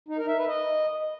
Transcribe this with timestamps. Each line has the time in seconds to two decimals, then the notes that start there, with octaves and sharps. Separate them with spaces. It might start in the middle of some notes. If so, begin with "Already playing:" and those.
0.09 D#4
0.18 A#4
0.28 E5
0.38 B4
0.48 D#5